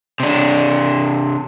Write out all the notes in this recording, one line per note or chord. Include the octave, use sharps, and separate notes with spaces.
C3 D4